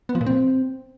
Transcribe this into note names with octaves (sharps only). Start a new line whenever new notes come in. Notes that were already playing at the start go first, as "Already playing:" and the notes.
B3
F3
A#2
C4